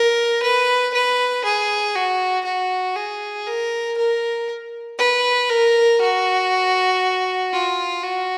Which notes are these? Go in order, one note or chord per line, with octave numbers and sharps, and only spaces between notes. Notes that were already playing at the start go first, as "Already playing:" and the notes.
Already playing: A#4
B4
B4
G#4
F#4
F#4
G#4
A#4
A#4
B4
A#4
F#4
F4
F#4